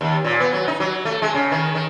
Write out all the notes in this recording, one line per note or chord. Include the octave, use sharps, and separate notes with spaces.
D#2
A#2
B3
F#3
D#4
F#3
A3
G#3
C#3
D#3
D#3